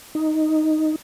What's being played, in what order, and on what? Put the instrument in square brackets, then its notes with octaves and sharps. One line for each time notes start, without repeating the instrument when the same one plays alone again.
[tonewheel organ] D#4